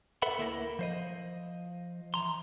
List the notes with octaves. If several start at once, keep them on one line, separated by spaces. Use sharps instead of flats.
A4 B4 E5 F#5 B5
D2 A#3 E4 A4 A#4
F3 C5 D#5
E3 A#5 C6